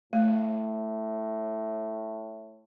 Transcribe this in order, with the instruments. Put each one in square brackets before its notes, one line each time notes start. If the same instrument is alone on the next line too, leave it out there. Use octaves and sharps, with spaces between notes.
[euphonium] A2 [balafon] A3